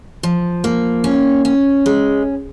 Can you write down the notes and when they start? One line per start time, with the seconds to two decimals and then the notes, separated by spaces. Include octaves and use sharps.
0.23 F3
0.64 A#3
1.04 C#4
1.45 C#4
1.86 G#3